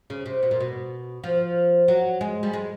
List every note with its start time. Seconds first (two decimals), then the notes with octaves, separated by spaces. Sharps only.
0.10 C#3
0.26 C3
0.43 B2
0.51 A#2
0.60 B2
1.24 F3
1.88 F#3
2.21 G#3
2.43 G3
2.53 G#3